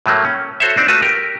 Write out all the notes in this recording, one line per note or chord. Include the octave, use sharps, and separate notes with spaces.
A2 F#3 A3 A#3
C#4
F#4 A4 C5 C#5 E5
C4 D4 D#4
A3 F4 F#4 B4
G4 A#4